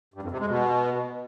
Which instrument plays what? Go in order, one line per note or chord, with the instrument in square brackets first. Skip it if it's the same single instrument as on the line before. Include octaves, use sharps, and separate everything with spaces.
[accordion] G2
F2
C3
G#3
B2